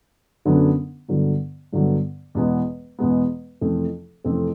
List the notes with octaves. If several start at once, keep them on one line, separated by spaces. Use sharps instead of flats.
F#2 D3 F#3 B3 D4
G2 D3 F#3 B3
G2 D3 F#3 B3
E2 B2 G#3 B3
E2 B2 G#3 B3
F2 C3 E3 A3 C4
F2 C3 E3 A3 C4